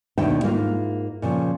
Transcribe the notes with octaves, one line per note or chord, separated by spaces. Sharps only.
D#2 B2 D#3 D4 E4 G5
G#2 A#3 E4 F4
A#2 C#3 F3